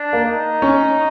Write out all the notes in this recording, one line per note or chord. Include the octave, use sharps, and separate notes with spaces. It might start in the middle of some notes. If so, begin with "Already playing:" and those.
Already playing: D4
A#3
D#4
C#4